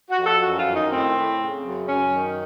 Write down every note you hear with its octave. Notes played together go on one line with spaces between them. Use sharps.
F#4
F2
A4
F#2 F#4
F4
D#3
D#4
A2 C4
A2
C#3
F#2
F#2 C#4
D#3